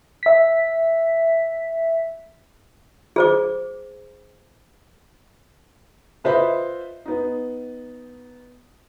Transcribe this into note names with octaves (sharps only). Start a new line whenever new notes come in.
E5 B6
G#4 C5 D6
F4 B4 C5 D#5 E5 B5
B3 D#4